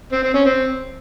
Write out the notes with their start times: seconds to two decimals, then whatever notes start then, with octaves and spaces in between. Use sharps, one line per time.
0.12 C4
0.23 C4
0.34 C#4
0.45 C4